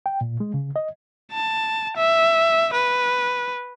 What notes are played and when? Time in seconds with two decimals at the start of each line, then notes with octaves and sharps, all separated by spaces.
0.06 G5
0.21 A#2
0.40 G#3
0.54 C#3
0.76 D#5
1.32 A5
1.96 E5
2.73 B4